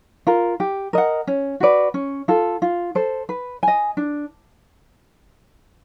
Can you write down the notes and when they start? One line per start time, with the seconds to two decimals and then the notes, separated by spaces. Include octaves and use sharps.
0.27 F4 A#4
0.60 G4
0.93 A#4 D#5 F#5
1.27 C#4
1.60 F#4 B4 D5
1.94 C#4
2.28 F4 A4
2.62 F4
2.95 A4 C5
3.29 B4
3.63 D#5 G#5
3.97 D4